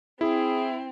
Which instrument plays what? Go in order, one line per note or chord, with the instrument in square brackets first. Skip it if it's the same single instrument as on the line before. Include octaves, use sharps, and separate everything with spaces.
[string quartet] C4 [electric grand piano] E4 [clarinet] G#4